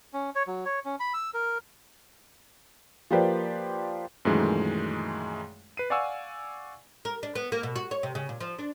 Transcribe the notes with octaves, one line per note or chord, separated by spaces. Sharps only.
C#4
C#5
F#3
C#5
C#4
B5
E6
A#4
F3 A#3 G4 B4 C5 D5
F#2 A#2 D#3 E3 G#3 A3
B4 C7 D#7
D5 F5 F#5 G#5 C#6 E6
A#4
D4
B3
A#3
B2
F#4
C#5
C3
C#3
A#2
F3
D4